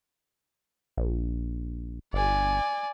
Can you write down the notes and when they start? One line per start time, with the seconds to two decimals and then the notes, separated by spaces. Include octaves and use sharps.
0.97 A#1
2.13 G1 D5 G#5